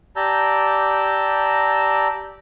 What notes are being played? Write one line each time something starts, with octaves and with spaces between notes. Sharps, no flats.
G4 D5 A5 A#5 E6 G6